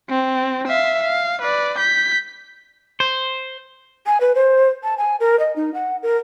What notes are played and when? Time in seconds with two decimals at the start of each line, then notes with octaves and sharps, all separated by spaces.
0.10 C4
0.67 E5 F5
1.03 F5
1.42 B4 D5
1.79 G6 B6
3.00 C5
4.06 G#5
4.21 B4
4.35 C5
4.83 A5
4.98 G#5
5.20 A#4
5.39 D#5
5.56 D#4
5.74 F#5
6.03 A#4